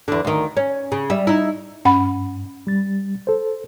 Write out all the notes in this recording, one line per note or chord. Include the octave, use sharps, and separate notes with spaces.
E2 D3
D2 D#3
C#4
C#3
G3 E5
D#4 E4
G2 C#4 F#5 B5
G3 A6
A4 C5